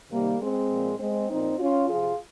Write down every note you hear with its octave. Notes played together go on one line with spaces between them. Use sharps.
C3 D#3 G3 A#3
G#3 C4
A#2 F3
G#3 C4
A#2 F3 C4 D#4
C#4 F4
F3 F4 G#4
C3